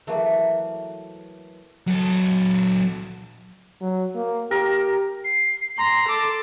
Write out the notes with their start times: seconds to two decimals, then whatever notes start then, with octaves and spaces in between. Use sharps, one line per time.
0.07 E3 F#3 A3 A#3
1.87 F#3 A4
3.81 F#3
4.15 A#3
4.51 G4 A#4
5.24 C7
5.78 A#5 C6
6.08 A4 D6